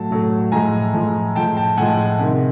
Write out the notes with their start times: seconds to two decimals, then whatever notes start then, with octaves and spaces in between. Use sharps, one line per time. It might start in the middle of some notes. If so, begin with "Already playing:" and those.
Already playing: A2 F#3 A3 A5
0.11 A2 F#3 A3
0.52 A2 F3 G#3 G#5 A#5
0.93 A2 F3 G#3
1.36 A2 F3 G#3 G5 A5
1.57 G5 A5
1.77 A2 F3 G#3 F#5 G#5
2.19 C3 D#3 G#3